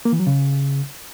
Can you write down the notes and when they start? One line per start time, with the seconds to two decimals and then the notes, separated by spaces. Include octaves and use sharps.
0.05 A#3
0.12 E3
0.20 F#3
0.27 C#3